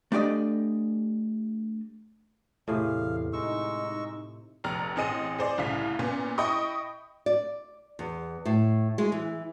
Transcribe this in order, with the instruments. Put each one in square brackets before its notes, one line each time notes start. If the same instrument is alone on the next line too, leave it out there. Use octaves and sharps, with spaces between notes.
[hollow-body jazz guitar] A3 D4 G4 D5 D#5
[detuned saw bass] E2 [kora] A2 C3 G#4 [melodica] F5
[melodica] G#3 C#6 E6 [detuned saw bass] D#4
[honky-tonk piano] F1 A#1 A#5 F6
A1 C4 G#4 D#5 D#7
G#4 C5 D5
C2 A2 C#3 F5 B6
A#2 B3 C#4
E4 D#5 G5 B5 C#6 D#6
[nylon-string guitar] D5
E2
A2
G#3
E3